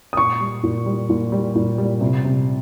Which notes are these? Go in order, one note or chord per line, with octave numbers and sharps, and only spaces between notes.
D#6
A#2 C#6
G3
A#2
G3
A#2
G3
A#2
G3
C3
C3